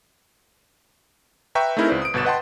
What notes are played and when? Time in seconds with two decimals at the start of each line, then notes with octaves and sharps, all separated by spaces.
1.55 B4 E5 G5 A#5 C#6
1.77 A3 C4 D#4 E4 G#4 A#4
1.89 C#2 B4 C5 D5
2.02 D#6 D7
2.14 G1 B2 B4 A6 E7
2.25 B4 D#5 F#5 G5 A5 C6